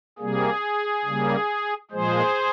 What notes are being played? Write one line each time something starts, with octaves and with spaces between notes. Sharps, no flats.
C3 G3 A#3 G#4
C#3 G3 A#3
A#2 F3 G#3 G#4 C5